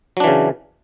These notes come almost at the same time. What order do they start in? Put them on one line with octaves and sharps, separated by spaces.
F#3 D4 E3 C#3